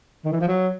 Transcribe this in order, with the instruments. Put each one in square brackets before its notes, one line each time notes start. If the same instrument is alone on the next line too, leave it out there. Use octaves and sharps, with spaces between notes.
[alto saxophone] D#3
E3
F3
F#3